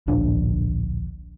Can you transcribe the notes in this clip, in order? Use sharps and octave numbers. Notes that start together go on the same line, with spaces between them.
D1 A#1 D4